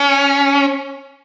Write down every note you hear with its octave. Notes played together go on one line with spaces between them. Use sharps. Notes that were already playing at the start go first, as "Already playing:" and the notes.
Already playing: C#4